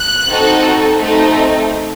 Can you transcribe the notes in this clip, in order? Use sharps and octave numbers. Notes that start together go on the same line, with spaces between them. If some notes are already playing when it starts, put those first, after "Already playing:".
Already playing: F#6
C4 D#4 F#4 A4
A3 C4 D#4